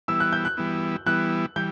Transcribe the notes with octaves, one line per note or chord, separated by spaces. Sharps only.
E3 G3 B3 E4 E6
F#6
G6
F#6
E3 G3 B3 E4
E3 G3 B3 E4 F#6
E3 G3 G6